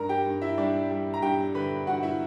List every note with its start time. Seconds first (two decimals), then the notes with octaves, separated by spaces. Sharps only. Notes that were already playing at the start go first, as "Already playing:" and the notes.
Already playing: G2 A#4 A#5
0.09 G4 G5
0.26 G2
0.42 E4 E5
0.58 G3 D4 D5
0.90 G3
1.14 A#5
1.22 G2 G4 G5
1.54 D3 B4 B5
1.87 G2 F#4 F#5
2.03 E4 E5